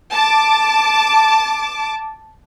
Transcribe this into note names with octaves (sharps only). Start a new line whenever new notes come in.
A5 D6